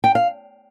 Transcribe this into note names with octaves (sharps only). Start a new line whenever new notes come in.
G5
F5